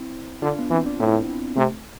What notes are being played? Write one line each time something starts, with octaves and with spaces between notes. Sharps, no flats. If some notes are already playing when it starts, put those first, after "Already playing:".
Already playing: C4 E4
D3 D4 F4
B3
E3 C4
D4
A2 C4 E4
C3 A3 C4